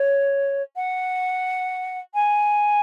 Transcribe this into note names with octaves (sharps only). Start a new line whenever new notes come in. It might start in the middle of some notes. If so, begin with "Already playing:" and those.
Already playing: C#5
F#5
G#5